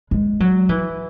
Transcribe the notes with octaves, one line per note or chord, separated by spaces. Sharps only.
G#3
F#3
E3